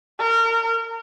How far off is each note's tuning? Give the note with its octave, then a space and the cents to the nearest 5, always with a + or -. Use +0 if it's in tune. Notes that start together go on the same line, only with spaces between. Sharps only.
A#4 -25